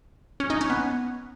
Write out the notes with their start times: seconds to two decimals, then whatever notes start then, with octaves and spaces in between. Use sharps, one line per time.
0.40 C#4
0.50 D#4
0.61 C#4
0.70 B3